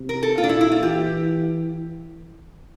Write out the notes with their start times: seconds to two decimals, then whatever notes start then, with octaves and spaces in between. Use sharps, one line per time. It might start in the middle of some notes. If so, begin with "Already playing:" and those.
Already playing: C3
0.09 A#4
0.23 A4
0.38 A#2 F4
0.44 D4
0.49 E4
0.61 E4
0.72 F4
0.82 E3 G4